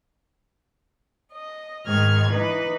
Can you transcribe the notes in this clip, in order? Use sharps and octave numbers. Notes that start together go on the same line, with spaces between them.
D#5
G#2 D#3 F6 G#6
E3 D#4 B4